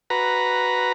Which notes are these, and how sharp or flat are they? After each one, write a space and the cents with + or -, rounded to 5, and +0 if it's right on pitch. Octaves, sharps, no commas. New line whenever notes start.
F#4 +0 B4 +0 A#5 +5